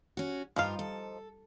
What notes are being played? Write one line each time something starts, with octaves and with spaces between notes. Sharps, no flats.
C#4 F#4
G2 F3 D#4 F4 F5
A4